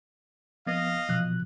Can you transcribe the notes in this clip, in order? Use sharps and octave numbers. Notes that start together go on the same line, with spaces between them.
F3 B3 B4 D#5 F5
B2 E3 F3 F#6